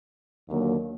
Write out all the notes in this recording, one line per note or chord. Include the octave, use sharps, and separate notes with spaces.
D#2 D3 F#3 A#3